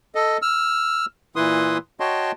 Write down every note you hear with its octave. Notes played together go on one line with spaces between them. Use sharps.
A4 D#5
E6 F6
A#2 E3 E4 B4 C6 D#6
F#4 C#5 D#5 G5 A5 C6